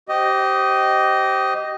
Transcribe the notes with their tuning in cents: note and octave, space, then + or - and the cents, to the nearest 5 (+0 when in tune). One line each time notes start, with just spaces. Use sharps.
G4 -25 C5 +0 D#5 +0